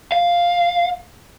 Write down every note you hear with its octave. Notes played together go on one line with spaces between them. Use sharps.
F5